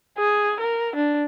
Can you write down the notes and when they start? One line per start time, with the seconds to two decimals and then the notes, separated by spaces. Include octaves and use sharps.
0.18 G#4
0.60 A#4
0.96 D4